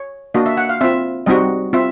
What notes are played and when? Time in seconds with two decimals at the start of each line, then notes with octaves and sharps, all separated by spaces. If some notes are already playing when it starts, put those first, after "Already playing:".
Already playing: C#5
0.34 A#3 D4 F#4 D#5
0.46 E5
0.57 F#5
0.69 F5
0.81 C4 F4 E5
1.26 G3 C4 D#4 F#4 D#5
1.73 C4 F4 E5